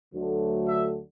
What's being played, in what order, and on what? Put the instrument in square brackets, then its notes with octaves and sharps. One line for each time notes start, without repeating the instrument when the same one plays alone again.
[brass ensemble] D2 D3 F#3 A3
E5